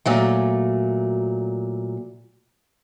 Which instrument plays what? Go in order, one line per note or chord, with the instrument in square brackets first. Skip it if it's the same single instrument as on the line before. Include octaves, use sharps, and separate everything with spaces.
[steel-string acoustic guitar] A#2 F#3 A3